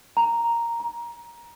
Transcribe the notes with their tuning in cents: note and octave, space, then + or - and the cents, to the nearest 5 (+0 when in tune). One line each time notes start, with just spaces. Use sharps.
A#5 +0
A#5 +20